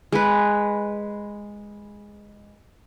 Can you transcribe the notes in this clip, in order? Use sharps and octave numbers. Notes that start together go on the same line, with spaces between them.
G#3 B4